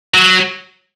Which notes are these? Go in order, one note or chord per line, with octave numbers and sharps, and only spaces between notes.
F#3